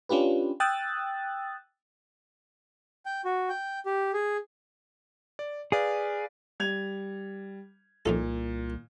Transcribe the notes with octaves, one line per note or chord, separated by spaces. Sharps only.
C#4 D4 F4 G4 B4
G5 D#6 E6 F#6 A6
G5
F#4
G5
G4
G#4
D5
G#4 B4 D5 F5
G3 G#6 F7
C2 F2 A#2 D#4 A4